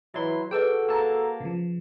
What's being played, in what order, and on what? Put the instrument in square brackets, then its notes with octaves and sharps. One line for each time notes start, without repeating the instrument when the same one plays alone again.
[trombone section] E3 [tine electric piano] F#3 E4 C6 [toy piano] D#5
[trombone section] F#4 A4 [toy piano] G#4 B4 D#5 [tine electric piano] G5 E6
[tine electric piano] A#3 A5 [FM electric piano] A#5 E6
[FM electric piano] C#3 F3